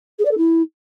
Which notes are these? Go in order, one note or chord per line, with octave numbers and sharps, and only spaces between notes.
G#4
D5
A4
E4